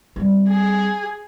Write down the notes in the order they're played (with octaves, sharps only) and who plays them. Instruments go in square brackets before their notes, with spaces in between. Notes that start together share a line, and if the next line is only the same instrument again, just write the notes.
[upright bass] G3 C4
[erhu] G#4